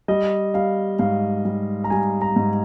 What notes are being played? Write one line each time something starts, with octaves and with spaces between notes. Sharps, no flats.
G3 D#5
G3 F5
G#2 F5
G3
A#5
G3 G#5
A#5
G#2